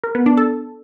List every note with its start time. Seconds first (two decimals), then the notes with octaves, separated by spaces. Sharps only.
0.04 A#4
0.15 B3
0.26 D4
0.37 A4